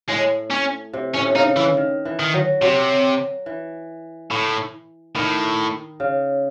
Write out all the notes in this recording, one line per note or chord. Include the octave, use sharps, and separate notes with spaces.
A2 G#3
C#4
C3
A2 C#4
C3
C#3 D#4
E3
D#3
E3
D#3
F#3
C3 F#3
E3
A2
A2 D#3
C#3